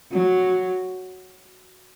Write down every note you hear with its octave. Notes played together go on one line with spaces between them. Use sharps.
F#3